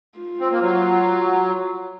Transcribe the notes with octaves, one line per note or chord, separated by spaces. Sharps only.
F4
C4
A#3
F#3